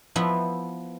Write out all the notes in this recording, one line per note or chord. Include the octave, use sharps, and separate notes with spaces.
F3 B3 E4